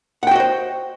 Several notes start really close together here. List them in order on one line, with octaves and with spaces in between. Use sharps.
F#5 G5 F#4 D#5 C5